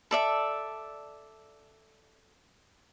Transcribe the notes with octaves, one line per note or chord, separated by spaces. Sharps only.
A4 D5 E5